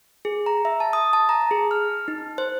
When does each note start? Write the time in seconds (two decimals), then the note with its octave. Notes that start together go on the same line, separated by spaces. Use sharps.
0.25 G#4
0.46 A#5
0.65 E5
0.80 A5
0.93 D#6
1.13 A5
1.29 A#5
1.51 G#4
1.71 F6
2.08 D#4
2.38 C5